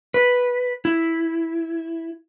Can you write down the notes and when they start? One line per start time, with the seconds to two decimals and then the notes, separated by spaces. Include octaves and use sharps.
0.14 B4
0.85 E4